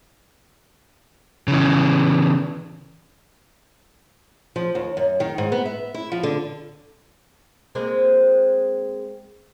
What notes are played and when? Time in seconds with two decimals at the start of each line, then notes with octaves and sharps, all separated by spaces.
1.48 C#3 E3
4.56 F3
4.75 D#2
4.97 F#2
5.20 D#3
5.38 G#2
5.52 B3
5.66 E5
5.94 E4
6.12 F3
6.23 D3
7.75 G#3 A#3 C4